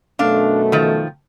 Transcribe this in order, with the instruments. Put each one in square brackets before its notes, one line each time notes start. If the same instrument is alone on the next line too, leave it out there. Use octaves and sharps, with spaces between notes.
[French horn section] F#2 B2 A3 [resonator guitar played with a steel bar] D4 F5
[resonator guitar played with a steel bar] D#3 F3